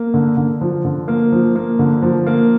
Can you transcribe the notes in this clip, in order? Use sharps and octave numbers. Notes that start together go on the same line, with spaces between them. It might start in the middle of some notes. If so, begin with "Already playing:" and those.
Already playing: A#3
D3
D3
F3
D3
A#3
F3
A#3
D3
F3
A#3